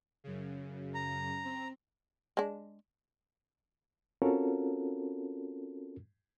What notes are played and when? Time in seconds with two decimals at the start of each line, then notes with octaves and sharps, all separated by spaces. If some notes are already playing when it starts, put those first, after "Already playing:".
0.24 F#2 C#3
0.94 A#5
1.44 C4
2.37 G#3 D4
4.22 C4 C#4 F4 F#4 A4 A#4